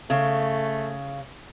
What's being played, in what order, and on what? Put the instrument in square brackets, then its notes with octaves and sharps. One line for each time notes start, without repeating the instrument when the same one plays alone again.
[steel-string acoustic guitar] C#3 [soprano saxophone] A3